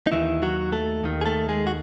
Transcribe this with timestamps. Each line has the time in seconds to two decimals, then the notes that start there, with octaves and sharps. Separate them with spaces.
0.07 D#4
0.12 D#2 D#3 E3 E4
0.42 F#3 F#4
0.72 A3 A4
1.03 D#2 D#3
1.21 G#4
1.26 A3 A4
1.49 G#3 G#4
1.67 F#4